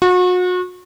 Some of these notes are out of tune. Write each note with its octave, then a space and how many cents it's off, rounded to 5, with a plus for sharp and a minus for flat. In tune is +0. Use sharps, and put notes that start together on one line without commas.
F#4 -35